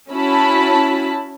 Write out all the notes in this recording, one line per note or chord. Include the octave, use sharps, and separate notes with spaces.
C#4 E4 F#4 A5 B5